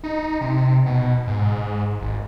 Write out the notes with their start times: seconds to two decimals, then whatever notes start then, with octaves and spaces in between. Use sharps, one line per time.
0.04 D#4
0.41 C3
0.86 B2
1.27 G#2
2.01 G#1